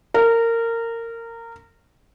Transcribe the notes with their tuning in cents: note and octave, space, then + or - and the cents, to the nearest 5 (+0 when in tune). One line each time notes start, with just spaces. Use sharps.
A#4 -20